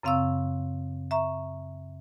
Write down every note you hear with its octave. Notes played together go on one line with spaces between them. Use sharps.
F#2 C#3 C4 F5 C#6 E6
E5 A#5 C#6